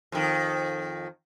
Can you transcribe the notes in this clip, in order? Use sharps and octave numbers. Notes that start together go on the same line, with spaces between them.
F2 D#3